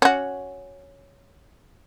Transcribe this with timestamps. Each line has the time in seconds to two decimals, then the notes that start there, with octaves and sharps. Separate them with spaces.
0.02 C#4 F#4